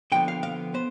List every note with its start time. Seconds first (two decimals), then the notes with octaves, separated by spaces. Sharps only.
0.12 D3 F3 B3 G5
0.28 F5
0.43 F5
0.74 B3 C5